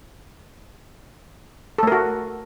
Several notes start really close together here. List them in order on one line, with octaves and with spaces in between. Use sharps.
A4 A3 A#4 F#4